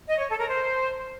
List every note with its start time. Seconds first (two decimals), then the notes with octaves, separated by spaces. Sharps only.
0.08 D#5
0.18 C#5
0.28 A4
0.38 A#4
0.49 C5